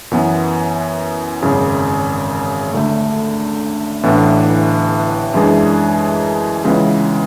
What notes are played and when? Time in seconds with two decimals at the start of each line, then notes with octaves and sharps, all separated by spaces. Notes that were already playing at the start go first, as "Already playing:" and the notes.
0.11 F#2 E3 B3
1.42 G#1 F#2 C#3
2.72 D2 D3 A3
4.03 A1 A2 E3 B3 D4
5.34 F#2 E3 G#3 D4 G#4
6.65 C#2 C#3 E3 G#3 B3